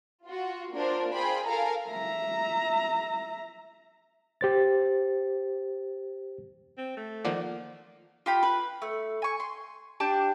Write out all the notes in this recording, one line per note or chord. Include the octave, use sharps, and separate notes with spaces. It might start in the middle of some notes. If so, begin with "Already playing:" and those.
F4 F#4
A#3 D4 F4 A#4 C5
F4 G#4 C5 G5 B5
A4 A#4 F5 G#5 A#5
E5 A#5
G4 C5 A6
C4
A3
D#3 F3 A#3 D5 F#5
F4 G4 B5
B4
A3
G#5 C#6
C6
D4 G4 A5